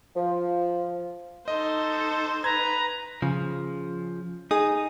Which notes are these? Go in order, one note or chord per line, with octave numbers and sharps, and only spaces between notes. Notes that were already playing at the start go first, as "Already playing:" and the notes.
F3
D#4 A4 C5 D#5
B4 A#5 G#6
C#3 F3
D#4 G#4 D#6